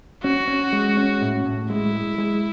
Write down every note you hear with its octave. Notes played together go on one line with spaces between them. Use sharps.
C#4 F#4
C#4
G#3
C#4
A2
A2
G#3 E4
G#3
G#3